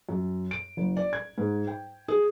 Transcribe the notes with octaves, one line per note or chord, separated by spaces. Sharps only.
F#2
D7
F#1
D5
G#6
G#2
G5
G#4